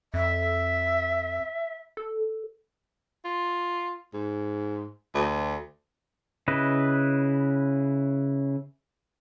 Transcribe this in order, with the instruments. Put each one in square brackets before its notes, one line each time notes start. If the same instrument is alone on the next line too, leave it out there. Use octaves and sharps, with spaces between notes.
[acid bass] F2 [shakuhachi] E5
[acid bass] A4
[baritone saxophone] F4
G#2
D2
[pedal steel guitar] C#3 E4 B4 D#5